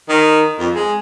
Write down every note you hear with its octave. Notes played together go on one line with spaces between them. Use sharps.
D#3
F2
G#3